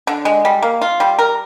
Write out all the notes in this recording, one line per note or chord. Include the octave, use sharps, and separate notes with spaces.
D3
G#3
G3
A#3
F4
G3
A#4